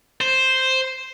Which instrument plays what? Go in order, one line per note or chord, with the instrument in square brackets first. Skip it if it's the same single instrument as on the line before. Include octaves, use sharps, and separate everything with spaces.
[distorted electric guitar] C5